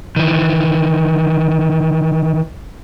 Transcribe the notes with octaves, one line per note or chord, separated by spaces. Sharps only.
D#3 E3